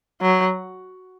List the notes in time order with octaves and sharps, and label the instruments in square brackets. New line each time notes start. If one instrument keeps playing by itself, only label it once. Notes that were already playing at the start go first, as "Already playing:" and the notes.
[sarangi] F#3